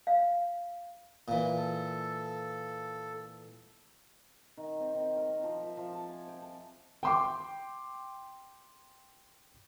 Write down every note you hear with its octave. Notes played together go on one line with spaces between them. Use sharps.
F5
A#2 E3
A4
D#3
C4
D#3
A#4
C4
F3
E5
F3
A5
G#5
G5
A5
G5 C6 D6